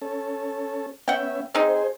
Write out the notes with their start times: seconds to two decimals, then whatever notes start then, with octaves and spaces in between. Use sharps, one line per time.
0.02 C#4 A4
1.08 B3 C#4 E5 F#5 G5
1.55 C4 D#4 G#4 C5